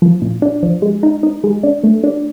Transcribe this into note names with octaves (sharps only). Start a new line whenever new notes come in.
F3
A#2
D4
F3
G#3
D#4
D#4
G#3
D4
A3
D4